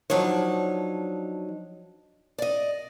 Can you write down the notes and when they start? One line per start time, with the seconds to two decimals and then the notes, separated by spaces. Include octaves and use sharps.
0.10 F3 F#3 D4 D#4 C#5
2.38 D5 D#5